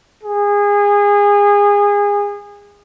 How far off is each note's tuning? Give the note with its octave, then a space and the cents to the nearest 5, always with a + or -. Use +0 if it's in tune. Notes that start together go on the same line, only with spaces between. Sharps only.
G#4 -25